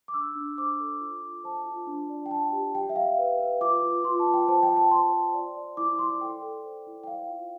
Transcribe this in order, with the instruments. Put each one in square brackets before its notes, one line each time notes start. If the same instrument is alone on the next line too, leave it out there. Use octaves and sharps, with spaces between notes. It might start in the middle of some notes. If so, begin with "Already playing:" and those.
[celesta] D6
D4 E6
D4
C5 D6
A4
F4
F4
C5 A5
F4
D4
D5
G5
D4 A5
G4
G4 G5
E5
G4 F5
B4
B4
F4 D6
F4
F4 C6
A5
F4
G5
C5 A5
G5
F4
A5
C5 C6
C5
D5
D5
E4 D6
D5 C6
A4 G5
A4
C5
E4
G5
C5 F5
F4